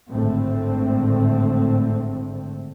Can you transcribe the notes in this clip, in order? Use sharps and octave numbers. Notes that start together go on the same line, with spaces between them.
G#1 A2 D3 A3 C4